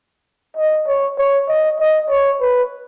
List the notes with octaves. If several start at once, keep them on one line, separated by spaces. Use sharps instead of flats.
D#5
C#5
C#5
D#5
D#5
C#5
B4